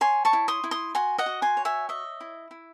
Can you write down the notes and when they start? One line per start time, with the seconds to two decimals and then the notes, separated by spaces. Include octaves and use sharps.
0.01 C#5 G#5 C6
0.25 A5 C#6
0.33 E4
0.48 C6 D#6
0.64 E4
0.71 C6 D#6
0.95 F#4 G#5 C6
1.18 D#5 F#5
1.26 F#4
1.42 G#5 C6
1.57 C#5
1.65 E5 G#5
1.89 D#5 E5
2.21 E4
2.51 E4